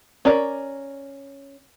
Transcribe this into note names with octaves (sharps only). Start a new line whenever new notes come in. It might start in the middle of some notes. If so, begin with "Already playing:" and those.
C#4 A#4 D5